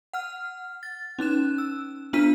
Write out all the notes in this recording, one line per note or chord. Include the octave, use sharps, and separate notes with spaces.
F#5 F6
A6
C#4 D#4 F#6 E7
E6
B3 D4 F4 F6 B6 D#7